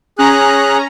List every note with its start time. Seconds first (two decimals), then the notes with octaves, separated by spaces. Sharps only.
0.19 C#4 G#4 A#5 F#6